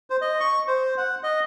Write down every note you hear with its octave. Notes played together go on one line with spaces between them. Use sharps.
C5
D#5
C#6
C5
F#5
D#5